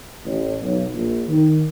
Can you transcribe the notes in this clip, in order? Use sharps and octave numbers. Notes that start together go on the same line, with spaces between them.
A1
B1
A#1
D#3